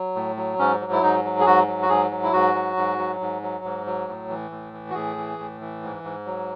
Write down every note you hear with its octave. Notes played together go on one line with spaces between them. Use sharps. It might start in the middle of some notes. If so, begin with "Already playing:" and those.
Already playing: F#3
A2
F#3
G#2 C#4
F#3
E4
G#2 D#4
F#3
G#4
G#2 F#4
F#3
F#4
G#2 G#4
F#3
E4
G#2 F#4
F#3
G#2
F#3
G#2
F#3
G#2
F#3
A2
E3
A2
E3
F#4
A2 G#4
E3
A2
E3
G#2
G#2
F#3